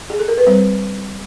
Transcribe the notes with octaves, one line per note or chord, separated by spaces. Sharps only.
G#4
A4
A#4
B4
G3 C4 C5